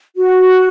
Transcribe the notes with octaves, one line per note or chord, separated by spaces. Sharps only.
F#4